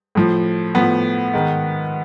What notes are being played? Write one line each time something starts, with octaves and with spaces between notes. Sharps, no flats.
A2 F3
A2 F3 B3
G#2 D#3